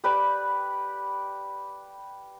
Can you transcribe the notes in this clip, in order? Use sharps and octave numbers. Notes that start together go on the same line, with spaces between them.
G4 B4 D5 B5